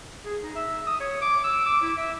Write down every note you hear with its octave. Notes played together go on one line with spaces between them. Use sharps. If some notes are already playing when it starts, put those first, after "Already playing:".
G#4
D#4
E5
D#6
C#5
D6
E6
D6
E4
E5